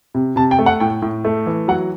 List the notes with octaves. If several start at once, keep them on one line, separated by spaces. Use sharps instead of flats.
C3
C3 A5
G5
A3
F#5
A2 G5
A2
A3
E3
F#3 F#5